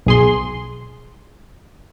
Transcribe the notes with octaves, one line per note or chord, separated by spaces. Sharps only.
B1 G#4 C6